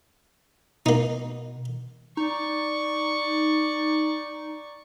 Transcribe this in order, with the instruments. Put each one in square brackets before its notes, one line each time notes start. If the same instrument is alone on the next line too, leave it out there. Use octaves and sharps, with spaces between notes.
[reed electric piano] B2 [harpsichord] A#3 D#4
[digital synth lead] D#4 [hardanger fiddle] D5 C#6